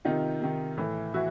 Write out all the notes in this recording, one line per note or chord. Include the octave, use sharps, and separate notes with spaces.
C3 D#3 D#4 F4
C3 D#3
A2 E3
E3 E4 F#4